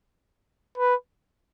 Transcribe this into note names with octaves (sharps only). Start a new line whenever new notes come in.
B4